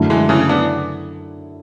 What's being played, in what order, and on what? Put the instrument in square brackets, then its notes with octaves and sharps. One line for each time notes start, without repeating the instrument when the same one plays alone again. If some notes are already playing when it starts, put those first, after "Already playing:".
Already playing: [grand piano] F#2 D3 A3 E4
[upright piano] E3 G#3
C#3 E3
B3 D4